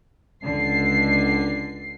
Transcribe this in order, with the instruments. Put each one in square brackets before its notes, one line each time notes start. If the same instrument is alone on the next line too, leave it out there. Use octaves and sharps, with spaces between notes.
[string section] C#2 D3 C7